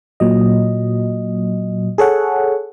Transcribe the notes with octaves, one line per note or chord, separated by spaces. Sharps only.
A#2 F#3 D#5
G#4 A4 C#5 F#5